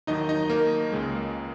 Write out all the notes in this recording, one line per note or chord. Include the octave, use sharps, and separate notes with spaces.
D#2 D#3 F#3 D#4 D#5
D#4 D#5
A#3 A#4
C#2 C#3 G#3